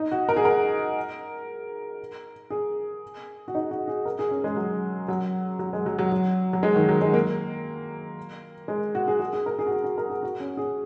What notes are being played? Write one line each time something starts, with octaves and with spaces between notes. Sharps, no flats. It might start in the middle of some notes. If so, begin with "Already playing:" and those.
Already playing: D#4
F#4
A#4
G#4
A#4
G#4
F#4
D#4
F#4
G#4
A#4
G#4
C#4
G#3
F#3
F#3
F#3
G#3
F#3
F#3
F#3
F#3
G#3
D#3
F#3
G#3
A#3
G#3
F#4
G#4
G#4
G#4
A#4
G#4
F#4
G#4
F#4
A#4
G#4
F#4
C#4
G#4